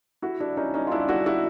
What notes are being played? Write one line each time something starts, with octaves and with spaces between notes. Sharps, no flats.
E4 F#4
D4 E4
C#4 D#4
C#4 D#4
F4
D4 E4
E4 F#4
E4 F#4